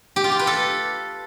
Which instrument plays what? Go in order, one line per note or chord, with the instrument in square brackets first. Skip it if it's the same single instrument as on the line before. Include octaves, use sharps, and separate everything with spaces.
[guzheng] G4
F4
G4
B4
A4